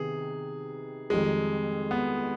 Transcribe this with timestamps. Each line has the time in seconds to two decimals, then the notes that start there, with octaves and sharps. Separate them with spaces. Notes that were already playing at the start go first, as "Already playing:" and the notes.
Already playing: C3 D#3 B3 G#4
1.10 F2 D#3 G3 G#3
1.91 B3